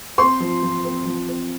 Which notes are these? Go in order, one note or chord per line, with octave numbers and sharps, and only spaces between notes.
C4 C5 C6
F3
F3
C4
F3
C4